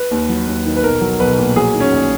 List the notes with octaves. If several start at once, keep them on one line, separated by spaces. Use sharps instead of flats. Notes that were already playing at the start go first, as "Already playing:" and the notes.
Already playing: B4
D#2
F#3
D#2
D#3
B4
B1 A#4
F#3
B1 B4
A#2
F#3 G#4
D#3
C#4
A#1